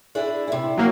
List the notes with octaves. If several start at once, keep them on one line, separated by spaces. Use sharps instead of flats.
D4 E4 G#4
C3 E4
F#3 A#3